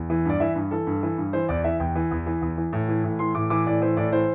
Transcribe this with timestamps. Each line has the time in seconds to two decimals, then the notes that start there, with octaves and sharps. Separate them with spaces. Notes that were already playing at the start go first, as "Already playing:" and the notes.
Already playing: E2
0.10 E3
0.25 G2 D5
0.40 E3 E5
0.55 G2
0.71 E3 A4
0.87 G2
1.03 E3
1.18 G2
1.33 E3 C5
1.49 E2 D5
1.64 E3 E5
1.80 E2 G5
1.95 E3
2.11 E2
2.26 E3
2.42 E2
2.58 E3
2.73 A2
2.89 E3
3.04 A2
3.19 E3 C6
3.35 A2 D6
3.50 E3 D6
3.66 A2 D5
3.82 E3 C5
3.97 A2 D5
4.12 E3 C5